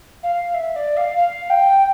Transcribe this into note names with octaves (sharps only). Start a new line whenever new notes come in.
F5
E5
D5
F5
F5
G5